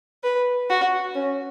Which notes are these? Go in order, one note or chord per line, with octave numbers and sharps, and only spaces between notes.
B4
F#4
C#4